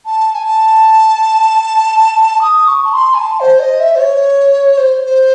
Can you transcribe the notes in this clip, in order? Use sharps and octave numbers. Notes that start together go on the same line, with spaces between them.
A5
G#5
A5
D#6
C#6
A5
C6
G#5
A5
C5
D#5
E5
C5
C#5
C5
C5